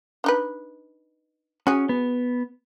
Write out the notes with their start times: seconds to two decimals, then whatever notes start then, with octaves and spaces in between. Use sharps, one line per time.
0.24 D4 D#4 B4
1.67 C#4 F#4 G#4
1.89 B3